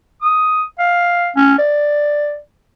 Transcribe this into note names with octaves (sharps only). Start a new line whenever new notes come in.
D#6
F5
C#4
D5